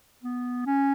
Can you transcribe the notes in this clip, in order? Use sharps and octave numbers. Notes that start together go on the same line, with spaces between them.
B3
C#4